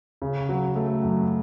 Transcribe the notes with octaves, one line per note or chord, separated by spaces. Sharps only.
C#3
F#3
A3
F#2